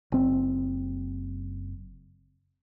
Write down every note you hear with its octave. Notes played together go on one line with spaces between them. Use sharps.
F#1 C4